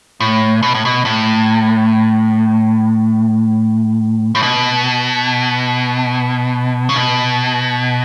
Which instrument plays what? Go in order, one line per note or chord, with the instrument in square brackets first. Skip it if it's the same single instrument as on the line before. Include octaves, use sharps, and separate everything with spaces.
[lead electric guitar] A2
B2
A2
B2
A2
A2
B2
C#3
B2